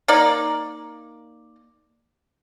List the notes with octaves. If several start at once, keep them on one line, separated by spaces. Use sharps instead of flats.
A#3 D#4 D5